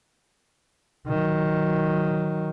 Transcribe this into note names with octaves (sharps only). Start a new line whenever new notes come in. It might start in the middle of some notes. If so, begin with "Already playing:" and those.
D#3 F#3